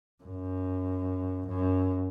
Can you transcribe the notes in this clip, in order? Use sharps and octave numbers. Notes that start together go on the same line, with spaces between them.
F#2
F#2